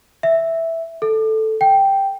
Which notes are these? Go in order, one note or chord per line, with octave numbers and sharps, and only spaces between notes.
E5
A4
G5